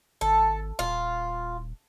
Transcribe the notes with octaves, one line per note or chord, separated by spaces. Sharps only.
G#1 A4
D#1 F4